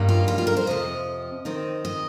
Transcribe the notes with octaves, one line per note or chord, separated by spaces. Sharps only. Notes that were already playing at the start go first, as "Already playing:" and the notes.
Already playing: G2 G3 A#3 D#4
F4
F4
F4
A#4
C5
F2 C3 F3 D#5
D#3 C4 D#4
D#5